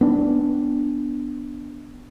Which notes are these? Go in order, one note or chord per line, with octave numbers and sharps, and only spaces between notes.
B3 D4